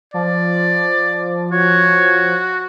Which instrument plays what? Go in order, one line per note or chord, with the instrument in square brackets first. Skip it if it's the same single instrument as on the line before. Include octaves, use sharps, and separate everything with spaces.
[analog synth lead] F3 [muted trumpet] D5
[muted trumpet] F#4 [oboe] C#5